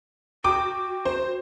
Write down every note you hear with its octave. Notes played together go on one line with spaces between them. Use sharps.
F#4 G5 D6
C5